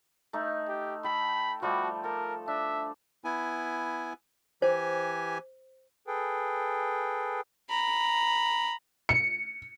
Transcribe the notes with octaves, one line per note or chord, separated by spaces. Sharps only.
A3 D#4
G4
A4 G5 B5
F3 G3 A3 F#4
A4 A#4
D4 E5
B3 E4 G#5
E3 G4 C5 G#5
G#4 A4 B4 G5
A#5 B5
C#7